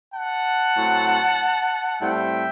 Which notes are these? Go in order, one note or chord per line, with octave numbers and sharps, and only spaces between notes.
F#5 A5
A2 F#3 C4
A2 G3 C4 E5 G5